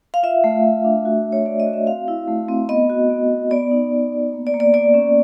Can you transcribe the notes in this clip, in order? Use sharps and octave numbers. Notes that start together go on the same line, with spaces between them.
F5
F4 E5
A3
A3
D4
F#4
F#4
C#5
D4 D5
D#5
F#4
E5
C4 F5
E4
A3
C4
B3 D#5
F#4
B3
B3
B3 D5
D#4
B3
B3
A#3
D5
A#3
D5
A#3 D5
C#4